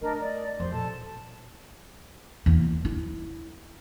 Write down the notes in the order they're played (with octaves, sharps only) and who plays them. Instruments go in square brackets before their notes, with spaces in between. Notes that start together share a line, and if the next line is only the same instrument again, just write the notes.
[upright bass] A3 [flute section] D4 A#4 D#5
[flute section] D5 D#5
[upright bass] F2 [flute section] G4 C5 C6
[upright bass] A#2 [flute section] A4 A5
[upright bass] E2 A#3
E4